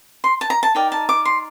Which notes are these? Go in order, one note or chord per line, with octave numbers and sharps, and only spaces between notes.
C6
A5
A#5
A5
D#4 A#4 D5 G5
A5
D6
C6